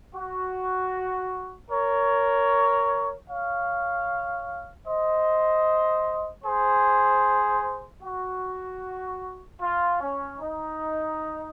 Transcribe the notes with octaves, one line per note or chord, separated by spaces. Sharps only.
F#4
A#4 C#5
C#5 F5
C5 D#5
G#4 C5
F#4
F4
C#4
D#4